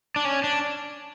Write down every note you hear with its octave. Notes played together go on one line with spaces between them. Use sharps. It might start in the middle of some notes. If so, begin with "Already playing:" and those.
D4
C#4
D4